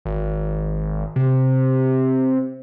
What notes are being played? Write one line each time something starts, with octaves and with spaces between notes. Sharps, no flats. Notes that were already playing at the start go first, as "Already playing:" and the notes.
G#1
C3